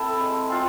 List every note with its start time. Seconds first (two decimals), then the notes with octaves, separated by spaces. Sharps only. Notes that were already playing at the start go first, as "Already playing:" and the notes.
Already playing: C4 E4 A4
0.21 G#3
0.50 C4 F4